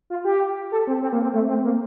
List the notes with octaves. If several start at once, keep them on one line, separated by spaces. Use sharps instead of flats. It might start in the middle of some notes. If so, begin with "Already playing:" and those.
F4
G4
A4
C4
C4
A#3
C4
A3
C4
A#3